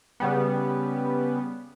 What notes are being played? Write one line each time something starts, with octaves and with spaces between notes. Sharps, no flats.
C#3 G3 B3